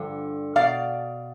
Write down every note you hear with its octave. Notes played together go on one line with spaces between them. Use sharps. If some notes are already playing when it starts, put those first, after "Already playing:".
Already playing: G2 D3 F3
B2 D5 F5